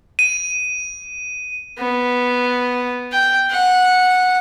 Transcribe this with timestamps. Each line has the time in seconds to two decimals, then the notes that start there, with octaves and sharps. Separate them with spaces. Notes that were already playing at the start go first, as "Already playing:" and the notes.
0.19 D#7
1.78 B3
3.12 G5
3.51 F#5